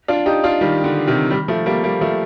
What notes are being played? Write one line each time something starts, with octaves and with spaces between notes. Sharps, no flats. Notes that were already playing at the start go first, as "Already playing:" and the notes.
D4 F4
D#4 G4
D4 F4
D#3 G3
D3
C3 D#3
D#3 G3
F3 A3
G3 A#3
G3 A#3
F3 A3